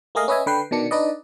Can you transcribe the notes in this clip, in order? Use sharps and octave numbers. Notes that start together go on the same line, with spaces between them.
A3 A#3 G#4 D#5 F5
C#4 B4 D#5 E5 G#5
D3 B4 G5 C7
B2 D#3 D4 C#7
D4 D#4 B4 D5 D#5